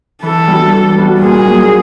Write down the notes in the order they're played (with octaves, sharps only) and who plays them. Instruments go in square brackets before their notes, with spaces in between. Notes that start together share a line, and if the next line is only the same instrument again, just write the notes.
[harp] E3 [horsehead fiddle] A4
[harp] G3 B3 D4 F#4
E3
G3 B3 D4 F#4
[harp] A#2 [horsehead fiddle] G#4
[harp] F#3 A#3